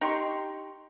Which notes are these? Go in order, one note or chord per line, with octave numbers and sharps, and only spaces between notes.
D#4 G4 C6 C#6